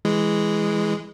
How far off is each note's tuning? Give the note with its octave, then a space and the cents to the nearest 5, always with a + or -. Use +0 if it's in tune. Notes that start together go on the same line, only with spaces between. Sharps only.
E3 +0 G#3 +0